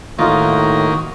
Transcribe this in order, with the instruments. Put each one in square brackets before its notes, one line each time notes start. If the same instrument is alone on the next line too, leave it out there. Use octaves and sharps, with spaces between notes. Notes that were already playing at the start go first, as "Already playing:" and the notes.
[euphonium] A2 [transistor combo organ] D#3 A#3 [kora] D#4 F4 [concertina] F#4